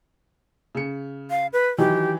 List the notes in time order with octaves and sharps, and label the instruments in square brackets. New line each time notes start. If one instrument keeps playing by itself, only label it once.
[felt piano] C#3 C#7
[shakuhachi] F5
B4
[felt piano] D#3 E3 F#3 [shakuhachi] G4